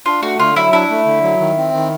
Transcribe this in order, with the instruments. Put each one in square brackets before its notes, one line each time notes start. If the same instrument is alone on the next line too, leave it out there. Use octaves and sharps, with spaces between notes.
[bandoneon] D4 [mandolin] F4
[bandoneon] A3 [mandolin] F#4
[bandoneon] D3 [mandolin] F4
[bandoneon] F#3 [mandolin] E4
[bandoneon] D4 [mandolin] E4
[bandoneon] A3
D3
F#3
D#3
C4
D#3